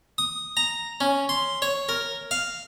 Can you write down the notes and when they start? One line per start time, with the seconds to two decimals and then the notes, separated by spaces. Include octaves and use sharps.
0.18 D#6
0.57 A#5
1.01 C#4
1.29 C6
1.62 C#5
1.89 A#4
2.31 F5